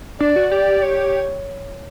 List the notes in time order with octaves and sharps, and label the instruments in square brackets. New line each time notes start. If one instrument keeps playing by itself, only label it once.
[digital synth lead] D4 [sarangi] D5
[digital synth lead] F#4
[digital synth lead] G4 [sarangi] D5
[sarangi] C#5